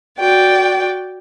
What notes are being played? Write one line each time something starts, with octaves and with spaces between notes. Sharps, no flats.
F#4 D5 G5